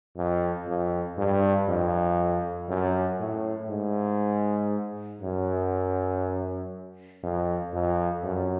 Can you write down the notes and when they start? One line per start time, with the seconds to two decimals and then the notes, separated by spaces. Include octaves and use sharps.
0.17 F2
0.67 F2
1.18 G2
1.68 F2
2.69 F#2
3.19 A2
3.70 G#2
5.21 F#2
7.23 F2
7.73 F2
8.23 F#2